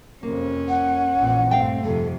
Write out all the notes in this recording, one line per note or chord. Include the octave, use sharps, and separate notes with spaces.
F2 C3 A#3 C#4
F#5
A#1 A#2 E3
G2 A3 C4 F5 G5
F2 C3 A4